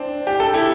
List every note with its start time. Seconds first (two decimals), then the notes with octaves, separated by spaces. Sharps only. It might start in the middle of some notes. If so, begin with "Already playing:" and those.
Already playing: C4 D4
0.27 G4
0.40 A4
0.54 E4 G4